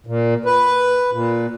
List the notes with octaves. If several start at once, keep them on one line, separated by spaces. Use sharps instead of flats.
A#2
B4
A#2